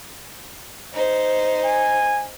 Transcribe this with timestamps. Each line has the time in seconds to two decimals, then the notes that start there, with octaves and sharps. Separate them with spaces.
0.95 D#4 C5
1.64 G#5